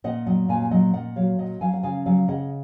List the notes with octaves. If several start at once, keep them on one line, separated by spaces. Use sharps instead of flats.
A#2 D#5 F#5
F#3 D#5 F#5
A#2 F5 G#5
G#5
F#3 D#5 F#5
A#2 D#5 F#5
F#3 C#5 F5
A#2 D#5 F#5
F#3 F5 G#5
F#5
C#3 F5 G#5
F#3 F5 G#5
C#3 D#5 F#5